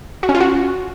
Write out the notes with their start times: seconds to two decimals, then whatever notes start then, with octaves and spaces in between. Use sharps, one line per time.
0.23 F#4
0.29 C#4
0.35 F4
0.40 F#4